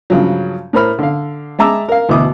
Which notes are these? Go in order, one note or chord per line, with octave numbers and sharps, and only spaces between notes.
G2 C#3 F3 F#3
A2 A#4 C5 B5 F6
D3 F5
G#3 E5 A5 A#5 D6 E6
A#4 F5
D2 B2 E3 E4 D6 D#6